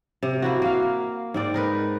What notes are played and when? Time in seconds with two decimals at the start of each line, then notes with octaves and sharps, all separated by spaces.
0.23 C3
0.42 A#3 E4 F#4
0.62 A#3 F5
1.34 G#2 C4 D5
1.54 D#4 A#4 B4